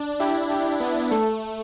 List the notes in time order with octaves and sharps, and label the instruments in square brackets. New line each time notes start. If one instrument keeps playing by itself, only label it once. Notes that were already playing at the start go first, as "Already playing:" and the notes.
Already playing: [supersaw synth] D4
[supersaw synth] E4 [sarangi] G4
[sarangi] G4
[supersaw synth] B3
[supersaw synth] A3 [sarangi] A4